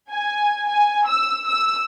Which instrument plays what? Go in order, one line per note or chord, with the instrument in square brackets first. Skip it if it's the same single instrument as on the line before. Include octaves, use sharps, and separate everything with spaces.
[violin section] G#5
G#5
E6
E6